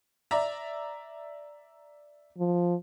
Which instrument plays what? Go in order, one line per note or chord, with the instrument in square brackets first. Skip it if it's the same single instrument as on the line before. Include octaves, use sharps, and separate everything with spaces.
[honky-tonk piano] D5 E5 A#5
[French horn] F3